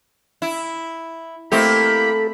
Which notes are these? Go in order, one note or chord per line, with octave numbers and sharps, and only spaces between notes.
E4
A3 A#3 C4 E4 G4 A4 D#5 B5